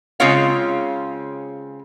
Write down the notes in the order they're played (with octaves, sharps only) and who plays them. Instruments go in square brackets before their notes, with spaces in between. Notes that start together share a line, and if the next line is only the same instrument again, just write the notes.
[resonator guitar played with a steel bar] C#3 G#3 C4 F4 C#5 F5